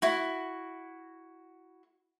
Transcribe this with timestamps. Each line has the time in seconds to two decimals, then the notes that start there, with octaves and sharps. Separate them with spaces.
0.02 E4 F#4